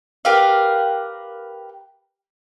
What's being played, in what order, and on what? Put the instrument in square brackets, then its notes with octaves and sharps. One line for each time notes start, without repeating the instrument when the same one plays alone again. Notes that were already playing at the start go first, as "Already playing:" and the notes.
[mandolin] G4 A#4 B4 F5